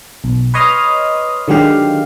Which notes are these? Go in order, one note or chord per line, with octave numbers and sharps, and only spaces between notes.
B1
B4 C#5 D#5 C6 D#6 F6
D3 D#3 F#3 G#3 G4 F5